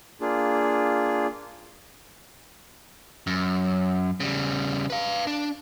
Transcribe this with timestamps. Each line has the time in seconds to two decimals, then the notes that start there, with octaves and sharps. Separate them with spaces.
0.21 A#3 D4 F4 G#4
3.27 F#2
4.20 C#3 G3
4.90 B4 F5
5.27 D4